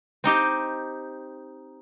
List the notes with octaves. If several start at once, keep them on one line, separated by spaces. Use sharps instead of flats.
C4 D#4 G4